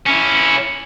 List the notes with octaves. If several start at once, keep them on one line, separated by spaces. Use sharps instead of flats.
C#4 E4